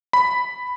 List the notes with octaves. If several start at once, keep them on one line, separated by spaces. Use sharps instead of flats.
B5